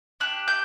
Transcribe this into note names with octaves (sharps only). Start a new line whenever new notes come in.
D4 G4 F#6
G6